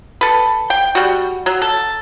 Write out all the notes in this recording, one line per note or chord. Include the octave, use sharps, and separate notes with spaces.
A4 B4
G5
G3 F#4
F#3
A4